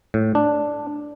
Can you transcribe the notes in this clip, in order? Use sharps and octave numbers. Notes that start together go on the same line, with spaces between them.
A2
D4